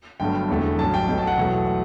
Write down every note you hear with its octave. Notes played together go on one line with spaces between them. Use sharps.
G1 G2 F#3 A3 G5
E1 E2 D3 A3
A1 G2 F#3 A5
G5
B1 B2 F#3 A3 G5
A5
F#5
E2 B2 F#3 A3